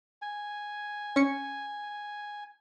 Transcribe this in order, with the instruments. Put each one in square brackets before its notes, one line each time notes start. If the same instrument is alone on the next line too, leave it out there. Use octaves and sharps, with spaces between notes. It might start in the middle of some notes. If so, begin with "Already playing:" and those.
[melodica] G#5
[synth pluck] C#4 C#7